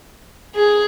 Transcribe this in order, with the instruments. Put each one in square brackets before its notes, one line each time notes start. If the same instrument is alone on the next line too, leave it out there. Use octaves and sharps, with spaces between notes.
[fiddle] G#4